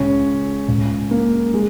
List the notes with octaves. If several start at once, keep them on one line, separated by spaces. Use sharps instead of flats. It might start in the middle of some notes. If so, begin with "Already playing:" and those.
Already playing: C#2 C#3 C#4
C#2 C#3
A#3
G#3